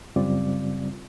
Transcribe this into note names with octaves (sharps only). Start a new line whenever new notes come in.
F#2 C#3 G3 C4 F4 D5